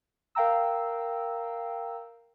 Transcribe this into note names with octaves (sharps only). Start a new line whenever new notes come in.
A#4 F5 G5 A#5 E6